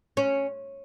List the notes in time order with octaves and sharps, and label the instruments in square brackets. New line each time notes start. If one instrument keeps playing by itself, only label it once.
[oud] C#4